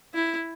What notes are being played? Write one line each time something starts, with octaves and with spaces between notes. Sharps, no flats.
E4